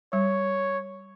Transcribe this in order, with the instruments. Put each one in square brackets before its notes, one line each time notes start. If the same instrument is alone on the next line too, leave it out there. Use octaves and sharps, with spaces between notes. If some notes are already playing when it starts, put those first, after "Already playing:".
[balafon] G3 [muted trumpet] C#5